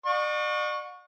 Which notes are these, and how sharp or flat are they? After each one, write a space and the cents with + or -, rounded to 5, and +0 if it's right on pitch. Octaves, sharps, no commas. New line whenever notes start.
D5 +45 F#5 -45 C#6 +0